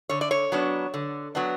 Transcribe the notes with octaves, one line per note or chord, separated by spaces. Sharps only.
D3 C#5
D5
C#5
F#3 B3 D4
D3
F#3 B3 D4